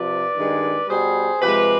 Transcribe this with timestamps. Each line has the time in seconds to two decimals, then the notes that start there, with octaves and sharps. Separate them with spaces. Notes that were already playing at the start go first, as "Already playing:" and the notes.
Already playing: C3 F3 B4 D5
0.35 G2 D#3 G#3
0.88 B2 G3 G#4 C5
1.41 C3 F3 G#3 G4 B4